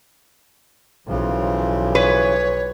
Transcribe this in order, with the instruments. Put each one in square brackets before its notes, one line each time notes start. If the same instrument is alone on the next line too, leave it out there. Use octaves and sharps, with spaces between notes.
[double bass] B1 [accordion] C#3 E3 F3
[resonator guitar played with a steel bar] B4 [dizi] C#5